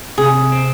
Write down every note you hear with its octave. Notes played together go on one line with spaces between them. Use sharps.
C3 G#4
C4